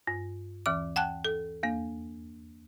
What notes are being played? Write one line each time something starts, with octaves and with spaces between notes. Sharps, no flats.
G2
D#2 E3 D6
F#5 G5 A5 F#6
A4
E2 A#3